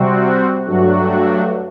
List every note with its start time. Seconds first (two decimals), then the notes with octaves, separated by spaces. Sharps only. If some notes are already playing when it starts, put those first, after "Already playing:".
Already playing: C3 G3 C4 F#4
0.64 G2 F#3 A3 D4 F#4